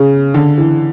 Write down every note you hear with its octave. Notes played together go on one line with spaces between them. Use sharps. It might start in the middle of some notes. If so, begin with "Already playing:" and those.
Already playing: C#3
D3
E3